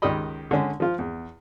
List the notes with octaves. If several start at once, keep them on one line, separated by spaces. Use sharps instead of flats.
C#2 D#3 G4 D#5 B5
D3 G#3 C#4
F3 F4
E2